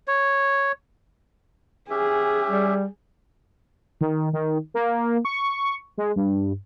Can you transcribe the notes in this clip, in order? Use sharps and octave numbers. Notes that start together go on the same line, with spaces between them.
C#5
C#4 G4 G#4 E5
G3
D#3
D#3
A#3
C#6
G#3
G2